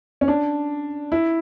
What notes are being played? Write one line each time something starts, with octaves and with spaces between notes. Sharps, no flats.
C#4
D4
E4